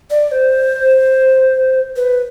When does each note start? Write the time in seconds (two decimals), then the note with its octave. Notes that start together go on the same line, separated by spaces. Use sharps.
0.11 D5
0.32 C5
1.96 B4